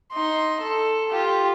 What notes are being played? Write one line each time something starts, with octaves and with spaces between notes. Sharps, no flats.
D#4 C6
A4
F4 G4